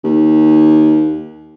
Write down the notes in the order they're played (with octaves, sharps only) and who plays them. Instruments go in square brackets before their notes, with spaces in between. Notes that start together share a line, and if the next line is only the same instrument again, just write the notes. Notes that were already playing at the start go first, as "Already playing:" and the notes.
[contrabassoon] D#2